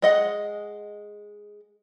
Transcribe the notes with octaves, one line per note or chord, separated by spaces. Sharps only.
G#3 D#5 F#5